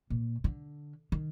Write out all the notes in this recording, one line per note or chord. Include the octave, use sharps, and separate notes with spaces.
A#2
D3
D#3